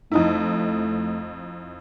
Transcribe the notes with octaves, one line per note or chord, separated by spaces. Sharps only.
F2 A3 D#4 E4